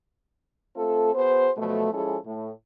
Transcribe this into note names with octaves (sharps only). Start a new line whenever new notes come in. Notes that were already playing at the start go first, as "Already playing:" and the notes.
A3 C4 F4 A4
B3 F#4 G#4 C5
B2 F3 F#3 A3
F3 G#3 C#4 E4 G#4 A4
A2